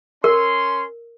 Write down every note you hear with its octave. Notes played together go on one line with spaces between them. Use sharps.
C#4 A#4 C6